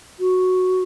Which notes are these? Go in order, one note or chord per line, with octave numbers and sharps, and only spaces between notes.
F#4